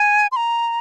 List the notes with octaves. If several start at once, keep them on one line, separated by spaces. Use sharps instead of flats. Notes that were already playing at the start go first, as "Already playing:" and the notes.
Already playing: G#5
C6
A#5